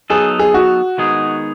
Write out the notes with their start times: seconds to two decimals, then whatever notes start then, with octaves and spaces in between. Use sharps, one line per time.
0.10 F#3 B3 D#4 G#4 A4
0.39 G#4
0.54 F#4
0.98 D#3 G#3 B3 D#4 G#4